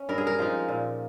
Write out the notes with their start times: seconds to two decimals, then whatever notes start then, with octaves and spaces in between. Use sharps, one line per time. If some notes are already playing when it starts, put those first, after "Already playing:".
Already playing: C#4
0.09 G2 A#4
0.18 G#4
0.27 A#4
0.39 F3 G#3 D#4
0.69 A#2